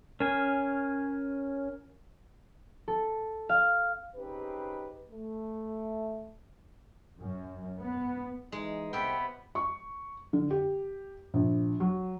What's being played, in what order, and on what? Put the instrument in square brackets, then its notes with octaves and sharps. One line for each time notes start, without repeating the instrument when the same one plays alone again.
[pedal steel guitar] C#4 G#5 [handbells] A#4
[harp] A4
F5
[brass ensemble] C#3 C4 D#4 G4 B4
A3
[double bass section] F#2
B3
[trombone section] E3 D#4 [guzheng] G#3
[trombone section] C2 C4 [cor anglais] B3 [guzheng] G4 E5 G5
[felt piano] C#6
D3
G4
A#1
F#3